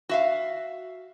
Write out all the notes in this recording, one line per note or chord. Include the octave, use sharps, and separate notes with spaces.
F#4 E5 F5